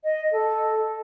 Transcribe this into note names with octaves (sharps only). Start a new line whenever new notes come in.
D#5
A4